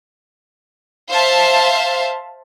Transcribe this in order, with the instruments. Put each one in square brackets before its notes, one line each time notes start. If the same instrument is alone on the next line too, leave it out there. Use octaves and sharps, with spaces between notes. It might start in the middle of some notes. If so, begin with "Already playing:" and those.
[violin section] C5 E5 F5 A5